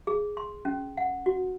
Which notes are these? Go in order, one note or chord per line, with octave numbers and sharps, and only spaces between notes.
G#4
C6
C#4
F#5
F#4